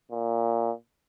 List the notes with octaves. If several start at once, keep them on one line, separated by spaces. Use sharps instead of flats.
A#2